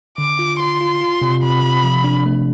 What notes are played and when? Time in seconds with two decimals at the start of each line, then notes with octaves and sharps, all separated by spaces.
0.18 D3 D6
0.39 F4
0.60 F4 C6
0.81 F4
1.01 F4
1.22 C3
1.42 C3 B5
1.63 C3
1.84 F3
2.04 D4
2.26 A3